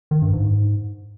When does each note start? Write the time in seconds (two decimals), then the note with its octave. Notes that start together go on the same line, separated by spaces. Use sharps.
0.11 D#3
0.22 G2
0.33 G#2